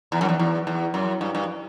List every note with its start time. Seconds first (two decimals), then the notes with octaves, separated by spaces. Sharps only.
0.12 E2
0.21 F#2
0.29 E2
0.39 E2
0.67 E2
0.94 F#2
1.21 G2
1.35 G2